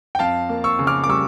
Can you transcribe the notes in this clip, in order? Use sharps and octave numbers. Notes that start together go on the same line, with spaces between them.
G5
F2 F5 A5
A#3
C#6 E6
C#3
D6 F6
D6
G3 C#6 E6